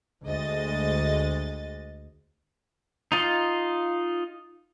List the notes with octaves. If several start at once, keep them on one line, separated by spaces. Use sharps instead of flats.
D2 G#3 D#5 A6
D#4 F4 D#5